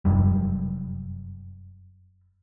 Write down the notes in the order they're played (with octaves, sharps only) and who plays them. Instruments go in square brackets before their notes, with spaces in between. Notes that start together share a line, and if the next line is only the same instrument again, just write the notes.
[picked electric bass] F1 C#2 F#2 G3